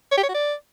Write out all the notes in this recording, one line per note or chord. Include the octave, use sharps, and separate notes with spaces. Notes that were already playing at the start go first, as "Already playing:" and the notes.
C#5
G4
C#5
F#4
D5